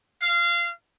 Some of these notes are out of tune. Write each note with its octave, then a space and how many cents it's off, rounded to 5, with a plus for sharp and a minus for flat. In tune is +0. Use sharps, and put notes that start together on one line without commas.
F5 -20